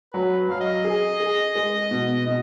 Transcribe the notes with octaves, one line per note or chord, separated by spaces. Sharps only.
F#3 B4
F#3 F5
D#5
G#4
G#4
G#3
B2
B2 D#5